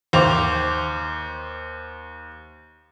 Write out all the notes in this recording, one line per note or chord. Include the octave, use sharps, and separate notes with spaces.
D#2 C5 D6 F7